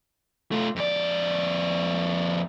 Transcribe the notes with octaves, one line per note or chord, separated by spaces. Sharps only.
A3 F4
F2 D5